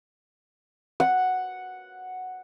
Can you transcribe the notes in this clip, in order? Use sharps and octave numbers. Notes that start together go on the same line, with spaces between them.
F#5